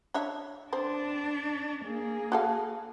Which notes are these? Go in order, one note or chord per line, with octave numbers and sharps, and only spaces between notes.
D4 C#5 E5
C4 D4 C5
A#3 G#4
F#4 A4 F5